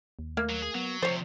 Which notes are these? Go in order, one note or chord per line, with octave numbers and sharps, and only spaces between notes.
D#2
A3 A#3 F6 G#6
F#3
G#4
F#3 B3
D2 C3 F3 C5 C#5 A6